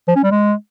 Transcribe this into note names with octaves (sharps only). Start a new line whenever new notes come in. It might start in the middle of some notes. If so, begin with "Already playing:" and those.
F3
C#4
G3
G#3